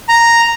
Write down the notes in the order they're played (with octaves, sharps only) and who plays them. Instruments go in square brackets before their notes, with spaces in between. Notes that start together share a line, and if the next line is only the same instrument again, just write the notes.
[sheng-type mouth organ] A#5